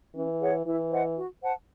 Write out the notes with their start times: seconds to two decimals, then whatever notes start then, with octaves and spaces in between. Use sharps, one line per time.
0.15 E3 C#4
0.40 G#4 C#5 F#5
0.65 E3 E4
0.91 C5 D#5 F#5
1.16 F#4
1.41 C5 F#5 A5